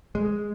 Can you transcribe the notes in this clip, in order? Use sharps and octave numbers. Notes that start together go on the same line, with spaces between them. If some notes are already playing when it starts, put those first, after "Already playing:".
G#3